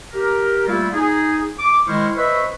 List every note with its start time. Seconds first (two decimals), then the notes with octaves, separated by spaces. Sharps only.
0.13 G4 A#4
0.67 G3 A3 A#3 E4 F4
0.93 D#4 G#4
1.59 D6
1.87 D#3 G#3 E4 C5 C#6 F6
2.17 B4 C5 D#5 E5 B5 C#6